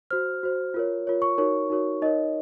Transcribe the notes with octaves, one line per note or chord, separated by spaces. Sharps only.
F#4 C5 F6
F#4 C5
F4 A#4 C#5
F4 A#4 C#5
C#6
D#4 F#4 A#4 C#5
D#4 F#4 A#4 C#5
D#4 A#4 C#5 D#5